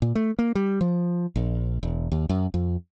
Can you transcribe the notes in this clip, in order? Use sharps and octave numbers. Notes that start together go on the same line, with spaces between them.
A#2
A3
A#3
G3
F3
A#1
E1
D#2
F#2
F2